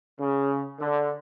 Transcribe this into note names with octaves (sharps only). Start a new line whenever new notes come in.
C#3
D3